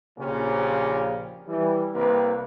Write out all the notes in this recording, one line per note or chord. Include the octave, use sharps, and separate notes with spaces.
A#1 A#2 C#3 F3 C#4 G4
E3 G3
C2 A#3 C4 B4